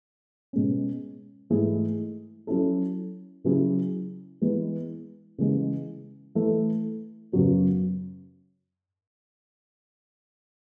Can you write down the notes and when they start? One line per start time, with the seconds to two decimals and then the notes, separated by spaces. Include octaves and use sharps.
0.53 B2 G#3 C#4
1.50 G#2 E3 A3 E4 G#4
2.47 F#3 C#4 E4 A4
3.44 C#3 F#3 C#4 E4 G#4
4.42 E3 G#3 B3
5.38 C#3 E3 G#3
6.35 E3 A3 E4 A4
7.32 F#2 C#3 F#3 B3